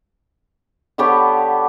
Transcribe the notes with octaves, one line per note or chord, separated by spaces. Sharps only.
D3 B3 G4 C#5